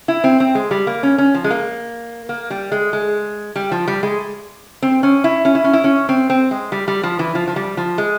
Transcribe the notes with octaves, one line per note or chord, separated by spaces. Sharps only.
E4
C4
C4
G#3
G3
A#3
C#4
C#4
F3
G#3
A#3
A#3
G3
G#3
G#3
G3
F3
G3
G#3
C4
C#4
E4
C#4
E4
C#4
E4
C#4
C4
C4
G#3
G3
G3
F3
E3
F3
F3
G3
F3
G#3